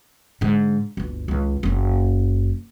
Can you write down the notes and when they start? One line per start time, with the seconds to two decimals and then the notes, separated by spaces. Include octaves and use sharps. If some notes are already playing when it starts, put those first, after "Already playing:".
0.41 G#2 D3
0.97 G1 D2
1.28 C#2 D#3
1.63 F#1 C#4